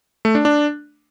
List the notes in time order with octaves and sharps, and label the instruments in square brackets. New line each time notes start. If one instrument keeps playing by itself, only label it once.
[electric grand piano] A3
D4
D4